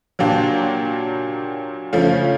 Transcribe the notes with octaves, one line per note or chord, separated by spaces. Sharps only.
A#2 F#3 A#3 D4 G4
C#3 F3 A3 C#4 F4